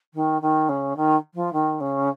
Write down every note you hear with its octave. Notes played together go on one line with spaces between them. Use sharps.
D#3
D#3
C#3
D#3
F3
D#3
C#3